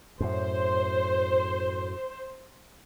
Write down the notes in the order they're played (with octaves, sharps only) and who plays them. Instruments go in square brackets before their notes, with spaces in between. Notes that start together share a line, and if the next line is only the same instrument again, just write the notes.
[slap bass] F#2 A2 [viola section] C5